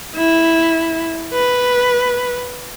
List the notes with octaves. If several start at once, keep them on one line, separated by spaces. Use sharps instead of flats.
E4
B4